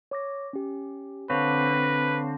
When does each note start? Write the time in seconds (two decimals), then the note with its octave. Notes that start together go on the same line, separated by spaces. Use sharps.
0.11 C#5 D6 A#6
0.53 C#4 G4
1.30 D3 C4 B4 C#5 F5 C#6